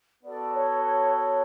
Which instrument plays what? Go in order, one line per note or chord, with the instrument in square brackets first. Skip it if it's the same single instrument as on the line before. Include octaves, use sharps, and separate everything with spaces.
[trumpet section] B3 F#4 A4 [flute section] D5
[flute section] C#5
C#5
C#5